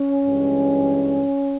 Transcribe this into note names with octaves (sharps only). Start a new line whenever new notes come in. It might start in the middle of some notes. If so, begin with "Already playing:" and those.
Already playing: C#4
G2 E3 G#3